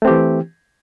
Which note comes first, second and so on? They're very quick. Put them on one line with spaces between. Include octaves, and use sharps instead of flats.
A3 C4 G4 E3